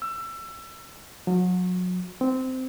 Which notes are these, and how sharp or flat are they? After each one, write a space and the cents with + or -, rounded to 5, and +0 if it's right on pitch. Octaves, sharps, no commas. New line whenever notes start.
E6 +25
F#3 -35
C4 -15